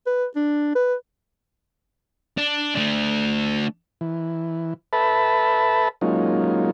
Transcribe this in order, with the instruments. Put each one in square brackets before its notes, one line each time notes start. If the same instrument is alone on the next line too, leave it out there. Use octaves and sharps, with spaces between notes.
[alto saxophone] B4
D4
B4
[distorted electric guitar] D4
A3 D4
[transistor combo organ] E3
A4 B4 E5 A5 B5
F#3 G#3 A#3 C#4 D#4 F4